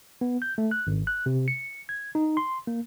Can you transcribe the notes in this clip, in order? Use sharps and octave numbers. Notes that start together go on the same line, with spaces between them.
B3
G6
A3
F#6
G#1
F#6
C3
C#7
G#6
D#4
C6
A#3